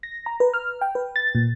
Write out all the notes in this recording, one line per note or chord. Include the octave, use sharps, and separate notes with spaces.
A#6
A#5
B4
F6
G5
B4
A6
A#2